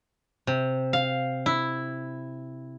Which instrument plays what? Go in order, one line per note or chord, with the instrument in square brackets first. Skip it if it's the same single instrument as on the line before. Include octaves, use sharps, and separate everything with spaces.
[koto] C3
F5
E4